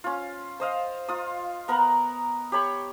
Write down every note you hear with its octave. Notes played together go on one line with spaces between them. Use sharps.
C#4 F4
C5 D#5 F5
F4 D#6
B3 A#4 F#5 A#5
G4 C#5 B5 C#6